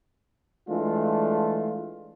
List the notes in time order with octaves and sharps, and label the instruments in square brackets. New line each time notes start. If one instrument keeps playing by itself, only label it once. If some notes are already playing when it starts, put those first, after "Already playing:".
[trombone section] E3 G#3 A3 D4 F4